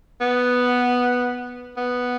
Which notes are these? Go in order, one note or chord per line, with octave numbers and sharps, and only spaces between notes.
B3
B3